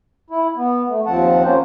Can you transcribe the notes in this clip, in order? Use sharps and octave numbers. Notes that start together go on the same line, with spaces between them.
E4
B3
A3
D#2 F3 C4 F#5 A5
A#3 C#4 C5